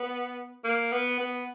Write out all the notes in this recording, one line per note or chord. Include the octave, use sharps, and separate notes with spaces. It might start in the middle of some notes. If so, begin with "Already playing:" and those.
Already playing: B3
A#3
B3
B3